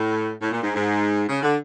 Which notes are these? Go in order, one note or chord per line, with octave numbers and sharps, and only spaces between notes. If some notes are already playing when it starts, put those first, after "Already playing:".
Already playing: A2
A2
A#2
G#2
G#2
C#3
D3